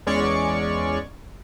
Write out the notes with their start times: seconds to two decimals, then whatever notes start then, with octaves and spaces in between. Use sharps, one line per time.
0.07 E2 G#3 C#4 C#5 D5 C#6